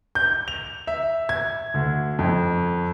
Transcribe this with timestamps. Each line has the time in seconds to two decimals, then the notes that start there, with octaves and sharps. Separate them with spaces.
0.15 G6
0.48 F7
0.87 E5
1.29 G#6
1.74 D2
2.19 F2